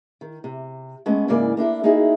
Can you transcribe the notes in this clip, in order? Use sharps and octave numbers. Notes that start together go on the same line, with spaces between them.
D#3
C3
G#3 A3 B3 C#4
G#2 C#3 E3 A#3 D5
A#3 D4 E4 A4
A#3 D#4 E4 F#4 G#4 A4